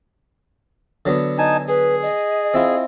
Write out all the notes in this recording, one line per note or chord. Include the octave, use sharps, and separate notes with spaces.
D3 F#3 B3
D#4 G#5 A5
G#4 B4
D#5
C4 E4 F4